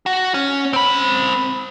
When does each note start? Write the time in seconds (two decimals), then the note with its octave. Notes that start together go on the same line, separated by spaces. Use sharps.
0.06 F#4
0.34 C#4
0.73 C4 B5